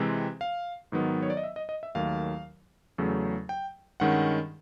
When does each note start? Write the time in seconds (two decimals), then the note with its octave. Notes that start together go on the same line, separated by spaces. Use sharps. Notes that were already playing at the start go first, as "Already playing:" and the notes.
Already playing: C3 E3 G#3 C4
0.41 F5
0.92 G#2 D#3 F#3 B3
1.23 C#5
1.30 D5
1.37 D#5
1.44 E5
1.56 D#5
1.69 D#5
1.83 E5
1.95 D#2 D#3 F#3 A3 F5
2.98 E2 C#3 F#3 A3
3.49 G5
4.00 G2 D#3 G#3 C#4 F#5